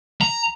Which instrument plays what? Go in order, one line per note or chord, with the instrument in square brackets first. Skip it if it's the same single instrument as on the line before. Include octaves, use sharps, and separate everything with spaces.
[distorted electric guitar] A#5